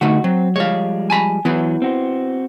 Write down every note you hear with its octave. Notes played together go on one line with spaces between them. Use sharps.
D3 A3 D#4 F#4
F#3 C4
F3 G3 G#3 C#5 F5
G#5 A5 B5
E3 F#3 B3 E4 B4
C4 F#4 C5